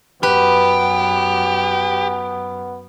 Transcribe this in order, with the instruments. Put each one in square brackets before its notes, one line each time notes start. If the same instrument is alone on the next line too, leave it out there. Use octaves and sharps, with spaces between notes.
[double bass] F#2 [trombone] B3 [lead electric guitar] G4 [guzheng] B4